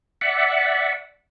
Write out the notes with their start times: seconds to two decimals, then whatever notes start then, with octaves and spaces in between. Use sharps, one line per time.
0.21 D5 E5 F#5